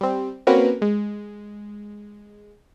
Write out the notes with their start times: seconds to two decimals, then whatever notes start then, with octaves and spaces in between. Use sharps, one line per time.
0.01 G3 C4
0.47 A#3 C4 C#4 F#4 A#4 B4
0.82 G#3